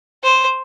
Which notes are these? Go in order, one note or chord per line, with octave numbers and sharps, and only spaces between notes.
C5